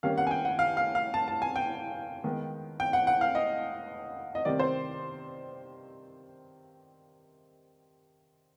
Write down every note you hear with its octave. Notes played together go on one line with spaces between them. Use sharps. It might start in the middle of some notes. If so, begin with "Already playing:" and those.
D#3 G3 A#3 C#4 F5
F#5
G#5
G5
F#5
F5
F5
F5
A5
A5
G#5
G5
D#3 G#3 B3
G5
F#5
F#5
F5
D#5
D#5
C3 D#3 G3 C4 D5
C5